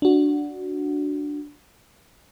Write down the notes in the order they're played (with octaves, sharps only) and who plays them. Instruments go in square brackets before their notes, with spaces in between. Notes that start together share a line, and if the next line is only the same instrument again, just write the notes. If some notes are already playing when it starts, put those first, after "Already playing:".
[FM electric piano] D4 F#4